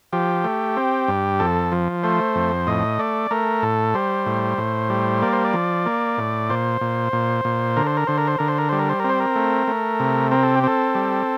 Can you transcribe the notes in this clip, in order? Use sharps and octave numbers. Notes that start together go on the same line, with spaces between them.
F3 G4
A3
C4
G2
F2 A4
F3
A3 C5
F2
A2 D#5
A3 D5
A3 A#4
A2 A4
G3 C5
A2
A2
G3
A#3 D5
C5
D5
F3
A#3
A2
A#2 C5
A#2
A#2
A#2
D3 A#4
C5
A#4
D3 C5
A#4
C5
D3 A#4
C5
A#4
G3 C5
A#4
C5
C4 A#4
C5
A#4
A3
A3
C3
C4 A#4
A4
G4
C4 A4
G3